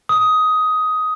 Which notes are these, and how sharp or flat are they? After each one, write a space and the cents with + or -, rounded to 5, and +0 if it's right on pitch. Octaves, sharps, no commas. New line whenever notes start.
D#6 +10